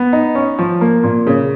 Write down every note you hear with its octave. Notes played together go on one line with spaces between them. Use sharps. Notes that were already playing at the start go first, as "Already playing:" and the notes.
Already playing: B3
D#4
C#4
F3
A#3
A#2
C#3